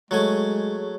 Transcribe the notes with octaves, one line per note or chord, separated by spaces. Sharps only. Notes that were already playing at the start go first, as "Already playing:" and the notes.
F#3 G#3 A3 G#4 C#5 G#5